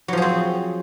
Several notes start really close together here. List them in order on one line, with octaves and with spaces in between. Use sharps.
F#3 F3 G#4 C4